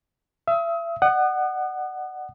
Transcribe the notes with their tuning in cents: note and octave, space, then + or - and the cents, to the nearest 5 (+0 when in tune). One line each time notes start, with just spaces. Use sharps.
E5 +35 D#6 +40
D5 +45 F#5 +15 D#6 -30